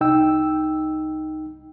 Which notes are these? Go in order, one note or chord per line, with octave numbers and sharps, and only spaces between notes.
C2 D#4 G5 E6